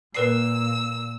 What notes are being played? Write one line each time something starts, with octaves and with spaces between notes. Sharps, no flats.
A#2 A#3 A#4 B4 E6 C7